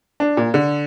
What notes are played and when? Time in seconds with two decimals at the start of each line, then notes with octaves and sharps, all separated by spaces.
0.20 D4
0.37 A#2
0.54 D3